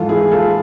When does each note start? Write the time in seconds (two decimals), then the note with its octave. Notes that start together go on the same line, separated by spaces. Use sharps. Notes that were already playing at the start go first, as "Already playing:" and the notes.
Already playing: G#2 E3 F4 A4
0.09 E4 G#4
0.32 F4 A4